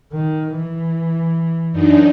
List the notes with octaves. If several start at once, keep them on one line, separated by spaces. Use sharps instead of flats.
D#3
E3
F#2 D4 D#4